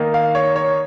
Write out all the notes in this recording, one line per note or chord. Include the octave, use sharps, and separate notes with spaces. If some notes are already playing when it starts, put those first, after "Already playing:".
Already playing: D#3 A#3 D#4
F5
C#5
C#5